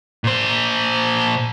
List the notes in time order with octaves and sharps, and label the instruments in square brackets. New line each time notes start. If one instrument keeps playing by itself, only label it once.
[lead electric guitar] A#2 C5